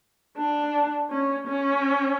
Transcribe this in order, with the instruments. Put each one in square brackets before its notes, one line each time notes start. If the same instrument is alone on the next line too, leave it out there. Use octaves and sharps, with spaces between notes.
[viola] D4
C#4
C#4